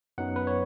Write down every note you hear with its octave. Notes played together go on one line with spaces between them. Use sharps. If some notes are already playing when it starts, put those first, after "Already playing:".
F#2 F#3 B3 D#4 F#5
B4
C#5